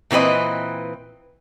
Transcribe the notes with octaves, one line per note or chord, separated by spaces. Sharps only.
A#2 E3 C4 B4 D#5